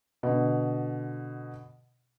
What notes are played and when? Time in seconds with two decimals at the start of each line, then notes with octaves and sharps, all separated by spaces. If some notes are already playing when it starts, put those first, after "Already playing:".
0.23 B2 D3